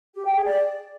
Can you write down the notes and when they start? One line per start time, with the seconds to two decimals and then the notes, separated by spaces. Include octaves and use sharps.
0.14 G4
0.24 G5
0.35 G#4
0.45 D5